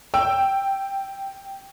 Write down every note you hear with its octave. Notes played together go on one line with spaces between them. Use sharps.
G5 E6